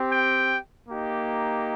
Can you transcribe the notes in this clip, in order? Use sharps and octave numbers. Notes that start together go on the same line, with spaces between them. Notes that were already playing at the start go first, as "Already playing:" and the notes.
Already playing: C4 G4
G5
A#3 D#4 G4